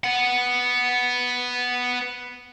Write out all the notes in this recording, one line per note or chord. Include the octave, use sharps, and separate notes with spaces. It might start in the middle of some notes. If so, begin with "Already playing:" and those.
B3 F#5